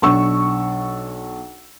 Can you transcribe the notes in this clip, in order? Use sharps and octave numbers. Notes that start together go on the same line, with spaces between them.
B1 D4 C#6 E6